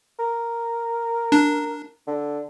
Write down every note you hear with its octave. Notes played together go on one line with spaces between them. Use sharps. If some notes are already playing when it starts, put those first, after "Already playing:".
A#4
D4
D3